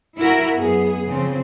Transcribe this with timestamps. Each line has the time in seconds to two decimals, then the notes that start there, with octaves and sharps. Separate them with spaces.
0.17 E4 F#4 A#4
0.55 F#2 B3 G#4
1.07 C#3 F3 C4